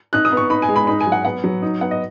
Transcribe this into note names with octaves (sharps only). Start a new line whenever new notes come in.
D#4 F#6
D#6
B3
C#6
D#4 B5
G#5
G#3
B5
D#4 B5
G#5
F#3
F#5
B3 F#5
F#3
D#4
B3 F#5
D#5